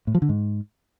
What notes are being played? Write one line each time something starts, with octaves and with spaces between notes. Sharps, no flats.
A2
F3
D3
G#2